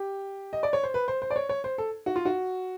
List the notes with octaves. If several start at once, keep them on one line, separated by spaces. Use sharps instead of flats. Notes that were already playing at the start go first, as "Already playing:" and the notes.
Already playing: G4
D#5
D5
C#5
C5
B4
C5
C5
D5
C#5
C#5
C5
A4
F#4
F4
F#4